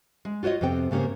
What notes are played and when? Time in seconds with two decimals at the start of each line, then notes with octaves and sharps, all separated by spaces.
0.25 G#3
0.43 F4 F#4 C5 C#5 D#5
0.61 F2 C3 B3 C4 G5
0.91 G#2 C#3 A#3 G4 C#5